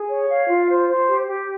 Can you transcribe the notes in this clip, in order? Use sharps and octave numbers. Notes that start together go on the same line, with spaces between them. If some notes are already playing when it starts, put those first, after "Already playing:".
Already playing: G#4
C#5
F5
F4
C5
C5
G4
G4